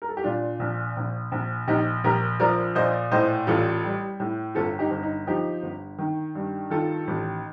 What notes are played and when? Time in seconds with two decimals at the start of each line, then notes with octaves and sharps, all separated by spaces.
0.02 A#4
0.09 A4
0.17 G4
0.24 A#2 D4 F4
0.60 A#1
0.97 A#1
1.32 A#1
1.67 A#1 D#4 G4
2.04 A#1 G4 A#4
2.40 F3 A#4 D5
2.75 A#2 C5 D#5
3.11 A2 C5 D#5
3.47 A1 F4 A4
3.84 G3
4.20 A2
4.55 G1 F4 A4
4.79 D#4 G4
4.91 G1
5.03 D#4
5.27 F3 D#4 G4
5.63 G1
5.98 D#3
6.35 G2
6.70 D#3 F4 A4
7.07 A1